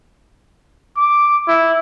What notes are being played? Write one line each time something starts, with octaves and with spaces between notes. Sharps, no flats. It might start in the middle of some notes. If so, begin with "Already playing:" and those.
D6
E4